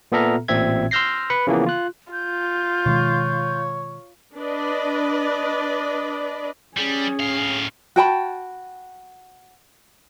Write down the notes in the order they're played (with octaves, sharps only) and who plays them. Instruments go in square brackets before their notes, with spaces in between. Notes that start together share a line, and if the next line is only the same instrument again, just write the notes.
[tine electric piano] A#2 B3 A4 E5 A#5 F6
A1 A#2 C4 E5 G#6
C6 E6 F6 G6 A#6 C7
B4 B5 C#7
C#3 E3 F3 A#3 B3
F4 F#6
[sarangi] F4 [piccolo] G6
[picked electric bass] B2 D#3 G#3 [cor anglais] C#5
[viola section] D4 B4 D5 D#5
[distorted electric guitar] G3 [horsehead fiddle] C#4 G#4
[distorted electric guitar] A2 F5
[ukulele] F#4 G5 A5 B5